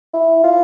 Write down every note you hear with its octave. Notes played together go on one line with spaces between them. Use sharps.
E4
F4